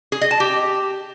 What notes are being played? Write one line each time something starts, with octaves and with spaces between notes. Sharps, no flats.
G#4
D#5
A5
G4